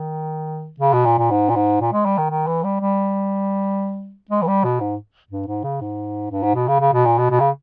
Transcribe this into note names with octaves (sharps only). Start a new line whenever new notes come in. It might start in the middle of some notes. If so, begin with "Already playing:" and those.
Already playing: D#3
C#3
B2
A#2
A#2
G#2
A#2
G#2
A#2
G#3
G3
D#3
D#3
E3
G3
G3
G#3
E3
G3
B2
G#2
G2
G#2
C#3
G#2
G2
G#2
B2
C#3
C#3
B2
A#2
B2
B2
C#3